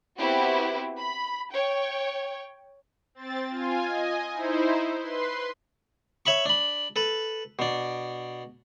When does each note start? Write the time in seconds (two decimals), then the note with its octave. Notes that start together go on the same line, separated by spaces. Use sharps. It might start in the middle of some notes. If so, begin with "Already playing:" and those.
0.18 B3 C4 E4 F#4 G4
0.97 B5
1.51 C#5 G5
3.15 C4 A6
3.51 F4 G#5
3.85 D#5 G#5
4.33 D#4 E4 C5
4.99 B4 C6
6.26 C#5 E5 B5 C#6
6.46 D4 B5
6.96 A4 B4
7.59 B2 D4